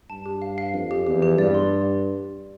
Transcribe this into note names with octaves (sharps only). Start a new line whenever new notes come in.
G2 A5
G4
F5
F5
F2 F5
G4
E2 G4
G4
G2 D5
C6